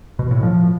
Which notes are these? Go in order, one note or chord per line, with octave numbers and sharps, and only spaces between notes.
B2
A2
F3